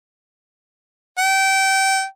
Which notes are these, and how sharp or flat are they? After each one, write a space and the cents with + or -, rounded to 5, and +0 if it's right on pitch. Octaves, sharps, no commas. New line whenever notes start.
G5 -25